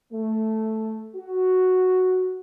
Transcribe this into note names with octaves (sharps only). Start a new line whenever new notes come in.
A3
F#4